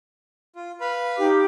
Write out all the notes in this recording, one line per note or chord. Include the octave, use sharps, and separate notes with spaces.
F4
B4 F5 B5
D#4 G4 D6